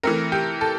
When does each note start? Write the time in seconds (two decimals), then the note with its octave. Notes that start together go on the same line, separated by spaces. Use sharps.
0.03 E3 A3 C4 A#4
0.32 G4
0.61 A4